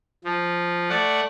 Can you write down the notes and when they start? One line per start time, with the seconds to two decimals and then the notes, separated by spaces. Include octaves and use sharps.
0.25 F3
0.89 A3 D5 F#5